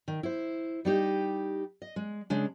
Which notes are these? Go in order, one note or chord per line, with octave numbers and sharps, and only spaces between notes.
D#3
E4 C5
G3 D#4 G4 D#5
D#5
G#3
C#3 G#3 D4